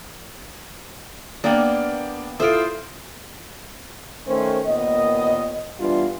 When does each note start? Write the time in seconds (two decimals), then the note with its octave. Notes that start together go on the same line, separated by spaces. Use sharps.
1.44 A#3 B3 D4 D5 G5
2.40 E4 F4 A4 C5 D#6 D7
4.27 D#3 A3 C#4 C5
4.65 D#2 A#2 B3 D#5
5.79 E3 G3 B3 D4 F4